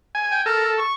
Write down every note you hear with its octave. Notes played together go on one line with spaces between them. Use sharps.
G#5
G5
A4 A#4
C#6